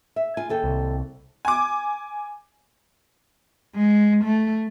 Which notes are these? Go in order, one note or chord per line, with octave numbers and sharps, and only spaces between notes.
E5
F4 G#5
D#2 A4 G5
C2
G#5 D6
G#3
A3